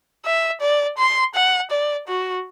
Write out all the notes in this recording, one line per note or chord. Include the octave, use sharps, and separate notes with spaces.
E5
D5
C6
F#5
D5
F#4